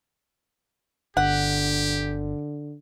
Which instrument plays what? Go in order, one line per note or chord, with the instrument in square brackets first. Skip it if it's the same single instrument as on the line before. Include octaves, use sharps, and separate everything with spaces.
[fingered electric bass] G1 [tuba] D3 [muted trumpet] G4 [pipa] F#5